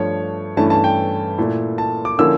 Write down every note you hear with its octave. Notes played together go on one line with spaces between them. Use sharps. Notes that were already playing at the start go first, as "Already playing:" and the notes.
Already playing: G2 F3 A3 C#5
G2 E3 A3 C#4 E4 A5
A5
G5
A#2 A3 E4
A5
D6
D3 F3 A#3 C#4 E4 E6